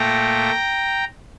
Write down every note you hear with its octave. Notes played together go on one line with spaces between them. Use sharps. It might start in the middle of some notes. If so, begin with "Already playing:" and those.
Already playing: A#2 A3 G5 A#5